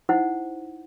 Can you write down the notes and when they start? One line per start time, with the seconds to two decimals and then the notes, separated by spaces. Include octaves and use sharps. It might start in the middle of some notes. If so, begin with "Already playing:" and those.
0.09 D#4 E4 C5 F#5